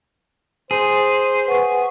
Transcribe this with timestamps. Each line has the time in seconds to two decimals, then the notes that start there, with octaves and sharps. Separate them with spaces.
0.71 G#4 C5
1.46 B4 F#5 C#6